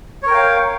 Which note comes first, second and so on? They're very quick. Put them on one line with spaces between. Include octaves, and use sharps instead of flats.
C#5 A#4 G5 F5